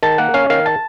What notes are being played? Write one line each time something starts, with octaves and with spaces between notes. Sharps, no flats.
D#3 A5
A#3 F#5
C#4 F5
D#3 F5
A5